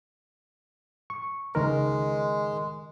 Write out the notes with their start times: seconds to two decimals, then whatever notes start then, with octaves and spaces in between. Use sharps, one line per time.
1.10 C#6
1.55 C#2 D#3 G#3 A#4